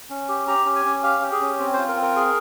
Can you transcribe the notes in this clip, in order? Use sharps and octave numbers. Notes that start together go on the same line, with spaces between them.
C#4
G4
G4 A#5
C#4
G#5
C#4
G4 F5
G4
G#4
C#4
C4
F4 C5
A#4
C4
A#4
G#4